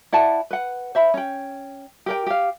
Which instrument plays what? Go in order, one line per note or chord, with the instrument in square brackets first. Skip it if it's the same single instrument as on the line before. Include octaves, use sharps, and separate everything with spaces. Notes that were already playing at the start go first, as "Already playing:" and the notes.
[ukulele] E4 D5 F#5 A5
B4 F#5
C5 E5 B5
C#4 G5
G4 A#4 G5
G4 F5